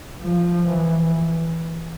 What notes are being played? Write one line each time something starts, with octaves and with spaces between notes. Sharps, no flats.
F3
E3